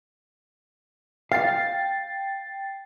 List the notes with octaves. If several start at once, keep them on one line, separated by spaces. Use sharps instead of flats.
F5 G5 A6 C7